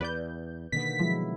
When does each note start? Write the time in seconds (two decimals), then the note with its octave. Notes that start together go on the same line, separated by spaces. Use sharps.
0.01 E2 B4 D5 G6
0.72 B2 D3 D#3 A#3 B3 B6
0.99 F3 F#3 G#3 E4